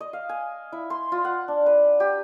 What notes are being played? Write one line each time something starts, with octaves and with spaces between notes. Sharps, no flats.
D#5
F5
G#5
E4
C6
F4
F#5
D4
B4
G4